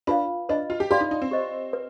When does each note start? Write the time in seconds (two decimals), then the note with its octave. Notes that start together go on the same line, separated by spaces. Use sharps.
0.07 D4 F4 B4 F5
0.49 D4 B4 D#5 B5
0.70 F4
0.80 G4
0.90 F4 G4 B4 D5 F5 C6
1.01 D#4
1.11 D#4
1.22 C4
1.31 G4 C5 D#5
1.73 B4